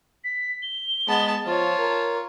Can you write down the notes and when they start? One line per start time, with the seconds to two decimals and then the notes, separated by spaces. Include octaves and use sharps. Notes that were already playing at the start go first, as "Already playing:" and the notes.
0.24 B6
0.62 G7
1.08 G#3 B3 A5
1.46 F3 F4 C#5 A5
1.78 A#4